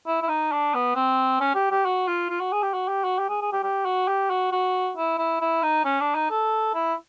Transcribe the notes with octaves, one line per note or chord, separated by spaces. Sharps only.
E4
E4
D#4
D4
B3
C4
C#4
G4
G4
F#4
F4
F4
F#4
G#4
G4
F#4
G4
F#4
G4
G#4
G#4
G4
G4
F#4
G4
F#4
F#4
E4
E4
E4
D#4
C#4
D4
D#4
A4
E4